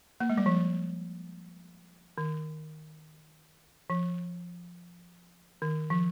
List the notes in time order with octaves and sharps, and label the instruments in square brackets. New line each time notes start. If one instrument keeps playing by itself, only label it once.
[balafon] A#3
G#3
G3
F3
D#3
F3
D#3
F3